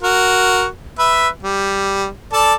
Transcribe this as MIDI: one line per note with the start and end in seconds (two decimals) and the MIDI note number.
0.02 0.66 66
0.02 0.66 70
0.99 1.28 71
0.99 1.28 76
1.42 2.07 55
2.33 2.54 69
2.33 2.54 74
2.33 2.54 81